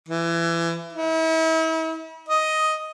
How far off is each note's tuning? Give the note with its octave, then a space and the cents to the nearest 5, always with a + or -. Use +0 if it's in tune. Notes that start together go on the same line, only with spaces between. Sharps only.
E3 +25
E4 -40
D#5 +5